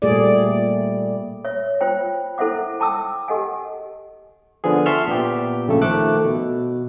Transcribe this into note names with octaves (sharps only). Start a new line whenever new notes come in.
A#2 G3 A3 G#4 D5
C#5 E5
F4 C5 G5
E4 A4 C5 E5 F#5 D6
G5 A5 D6 E6
G4 A4 D#5 F#5 G#5
D3 F3 B3 G#4
E5 A5 C6 C#6 E6 F6
A#2 B3 G4
A#1 C#3 A3 A4
D#3 F3 A3 A4 D6 F#6
B2